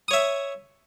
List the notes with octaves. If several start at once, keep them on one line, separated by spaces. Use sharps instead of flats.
C#5 E5 D#6